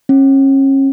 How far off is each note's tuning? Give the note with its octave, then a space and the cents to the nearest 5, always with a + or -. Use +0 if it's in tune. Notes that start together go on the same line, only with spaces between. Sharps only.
C#4 -35